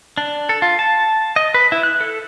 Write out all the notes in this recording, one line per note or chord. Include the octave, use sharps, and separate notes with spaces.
D4
A4
F4
A5
D#5
B4
E4
F#6
A4